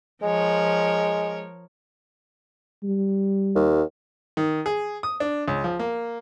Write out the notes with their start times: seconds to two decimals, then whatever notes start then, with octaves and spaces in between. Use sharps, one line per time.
0.22 F3 G#3 A#4 C#5
2.83 G3
3.55 D#2
4.37 D#3
4.66 G#4
5.03 D#6
5.20 D4
5.48 C#2
5.64 F3
5.79 A#3